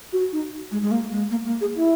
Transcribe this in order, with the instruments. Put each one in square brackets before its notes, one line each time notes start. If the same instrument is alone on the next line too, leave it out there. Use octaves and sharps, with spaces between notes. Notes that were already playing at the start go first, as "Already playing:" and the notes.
[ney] F#4
D#4
G#3
G#3
A#3
G#3
A#3
A#3
G#4
E4